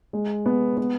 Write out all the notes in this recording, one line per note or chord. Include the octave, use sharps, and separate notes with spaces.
G#3
B3
B3